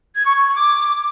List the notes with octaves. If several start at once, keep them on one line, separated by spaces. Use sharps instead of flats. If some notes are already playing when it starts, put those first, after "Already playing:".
G#6
C#6
G#6
G#6
D6